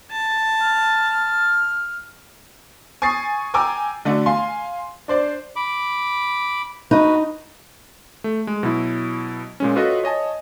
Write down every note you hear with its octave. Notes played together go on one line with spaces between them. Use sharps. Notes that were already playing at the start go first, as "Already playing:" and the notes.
A5
F6
G#5 C#6 D#6 A6 C7
G5 G#5 A#5 D6 E6
D3 A3 D4 F#4
F5 G#5 C6
D4 C5 D5
B5 D6
D#4 F#4 B4
A3
G#3
B2 F#3 E4
A#2 G#3 C#4
F4 F#4 A4 B4 C#5 D#5
C#5 D#5 G#5 A5